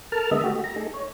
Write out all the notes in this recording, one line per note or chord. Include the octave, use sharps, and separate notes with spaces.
A4 A#4 A5 F6
D3 G#3 A#3 B3 D#5 E5
A3 F#4 G4
A#5
A3 D#4 G#4 A4
C#5